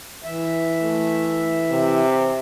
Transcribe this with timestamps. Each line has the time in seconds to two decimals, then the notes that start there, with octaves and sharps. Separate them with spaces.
0.24 E3 E5
0.82 A3
1.71 C3